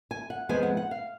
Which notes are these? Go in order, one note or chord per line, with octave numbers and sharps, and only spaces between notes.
G#5
F#5
F2 F3 G#3 B3 G#5
F#5
F#5
F5